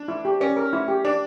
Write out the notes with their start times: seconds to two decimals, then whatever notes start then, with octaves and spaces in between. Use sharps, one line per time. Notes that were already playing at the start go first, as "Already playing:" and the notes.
Already playing: D4
0.08 E4
0.25 G4
0.40 C#4 D5
0.57 A#4
0.73 E4
0.88 G4
1.05 D4 D5